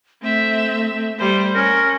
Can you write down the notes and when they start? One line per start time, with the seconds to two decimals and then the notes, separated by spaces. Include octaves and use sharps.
0.22 A3 C4 E5
1.18 G3 C5
1.55 C#4 A#4